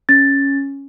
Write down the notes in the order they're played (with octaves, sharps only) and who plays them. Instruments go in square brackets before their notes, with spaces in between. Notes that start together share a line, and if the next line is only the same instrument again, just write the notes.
[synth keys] C#4 [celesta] A6